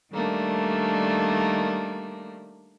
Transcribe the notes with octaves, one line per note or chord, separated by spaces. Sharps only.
D#3 G3 A3 A#3 D4